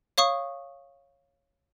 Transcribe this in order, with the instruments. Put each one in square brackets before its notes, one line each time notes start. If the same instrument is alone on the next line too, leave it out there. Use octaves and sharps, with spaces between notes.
[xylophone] C#5 F5 C#6 D#6